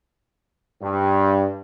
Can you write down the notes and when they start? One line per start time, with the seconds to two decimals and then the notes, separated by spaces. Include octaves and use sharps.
0.82 G2